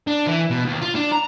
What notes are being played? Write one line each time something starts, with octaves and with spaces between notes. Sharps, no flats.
D4
E3
B2
D#2
F4
D4
A#5